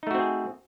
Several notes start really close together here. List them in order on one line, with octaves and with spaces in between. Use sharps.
D#4 A3 F#4 C4 G#4